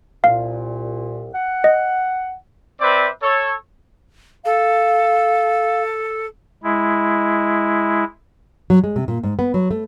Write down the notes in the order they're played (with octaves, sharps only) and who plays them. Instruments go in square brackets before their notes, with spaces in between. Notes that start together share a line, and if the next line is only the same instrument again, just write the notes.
[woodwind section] C2 A#2 [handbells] F5
[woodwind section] F#5
[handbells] D#5
[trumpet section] C4 B4 C5 D5 E5 D6
A4 C#5
[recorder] A4 [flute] F5
[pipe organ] G#3 E4
[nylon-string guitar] F#3
G#3
C3
A#2
G#2
B3
F#3
A3